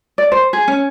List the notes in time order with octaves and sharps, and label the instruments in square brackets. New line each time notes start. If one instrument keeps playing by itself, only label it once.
[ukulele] D5
C5
G#4
C#4